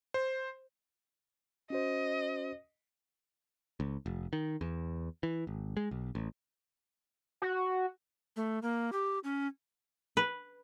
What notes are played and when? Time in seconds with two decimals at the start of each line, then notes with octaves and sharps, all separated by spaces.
0.14 C5
1.70 C#4 F#4 C5 D#5
3.80 C#2
4.06 F1
4.33 D#3
4.61 E2
5.23 E3
5.47 G#1
5.77 G#3
5.91 B1
6.15 A1
7.42 F#4
8.36 A3
8.62 A#3
8.93 G4
9.24 C#4
10.17 B4